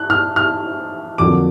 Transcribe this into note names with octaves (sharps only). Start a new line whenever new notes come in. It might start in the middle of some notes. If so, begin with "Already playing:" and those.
Already playing: F#6
F6
F6
F2 D3 F#3 A#3 D6